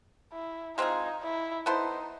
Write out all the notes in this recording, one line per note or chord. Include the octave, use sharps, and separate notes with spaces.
E4
G#3 C4 D#4 F4 G#4
E4
B3 D#4 E4 A4 C5